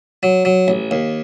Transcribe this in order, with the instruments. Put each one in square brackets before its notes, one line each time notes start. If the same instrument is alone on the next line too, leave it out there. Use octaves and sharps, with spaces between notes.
[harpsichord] F#3
F#3
A1
D#2